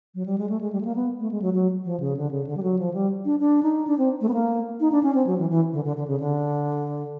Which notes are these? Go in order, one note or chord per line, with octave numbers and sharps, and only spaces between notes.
F#3
G3
G#3
A3
G#3
G3
A3
A#3
B3
A3
G#3
F#3
F#3
F3
C#3
D3
C#3
D3
G3
F#3
F3
G3
D4
D4
D#4
D4
C4
A3
B3
A#3
D#4
D4
C#4
C4
F#3
E3
E3
D3
D3
D3
C#3
D3